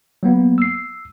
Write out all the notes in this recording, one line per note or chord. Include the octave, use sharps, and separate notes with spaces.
F#3 A#3 B3
E6 C7